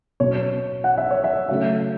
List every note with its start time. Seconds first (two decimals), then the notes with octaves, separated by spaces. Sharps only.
0.20 B2 F#3 C#4 C#5
0.84 F#5
0.98 E5
1.11 C#5
1.24 E5
1.48 C#3 F#3 A3 C#4 E5